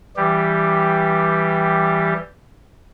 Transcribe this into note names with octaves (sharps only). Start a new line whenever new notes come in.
E3 G3 G4